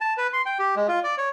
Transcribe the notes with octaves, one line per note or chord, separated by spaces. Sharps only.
A5
B4
C6
G5
G4
G#3
F4
D5
C#5